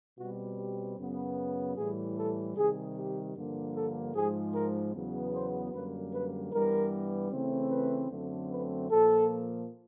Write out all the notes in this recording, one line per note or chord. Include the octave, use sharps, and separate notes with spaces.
B2 G3 C4 F#4
G4
F#2 C#3 F#3 B3
A2 E3 G3 G#4
A4
C3 D#3 G3 G#4
G4
G2 D3 F3 A#3
A4
G#2 F3 G#3 G#4
A#4
E2 C#3 F#3 B3
C5
F#2 D3 G3 A#3 B4
B4
G2 E3 G3 B3 A#4
C#3 E3 A3 C4
B4
F#2 D3 F#3 A3 C4
B4
A#2 F3 A#3 A4